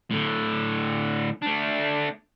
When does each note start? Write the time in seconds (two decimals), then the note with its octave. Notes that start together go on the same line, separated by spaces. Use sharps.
0.11 A2 D3
1.42 A3 D4